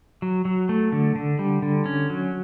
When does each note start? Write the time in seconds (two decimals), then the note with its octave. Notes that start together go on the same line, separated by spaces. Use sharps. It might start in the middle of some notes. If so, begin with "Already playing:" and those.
0.22 F#3
0.45 F#3
0.69 A3
0.92 D3
1.16 D3
1.39 G3
1.62 D3
1.86 C#4
2.10 F#3